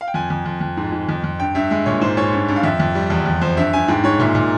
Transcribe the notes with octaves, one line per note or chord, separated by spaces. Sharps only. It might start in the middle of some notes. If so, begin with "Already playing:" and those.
F5
G5
F2 G#5
F2
F2
F2
G#2
G#2
F2
F2
G2 G5
G2 E5
G#3 E5
A#2 C#5
G#2 C5
G#2 C#5
G2
G2
F5
F2 E5
F2
G3
E2
F2
F2 C5
G2 E5
G2 G#5
G#2 G5
G#2 C#5
A#2 E5
A#2